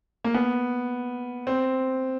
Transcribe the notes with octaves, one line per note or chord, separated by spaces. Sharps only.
A#3
B3
C4